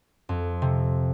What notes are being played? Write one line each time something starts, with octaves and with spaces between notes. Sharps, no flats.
F2
C3